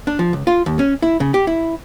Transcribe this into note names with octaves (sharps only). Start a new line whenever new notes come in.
D4
F3
C#2
F4
D#2
C#4
E4
C#3
G4
E4